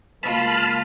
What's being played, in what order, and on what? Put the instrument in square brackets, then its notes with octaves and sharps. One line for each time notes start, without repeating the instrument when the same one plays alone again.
[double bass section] C#2 A#3 [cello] F4 [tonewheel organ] A5 B5 F6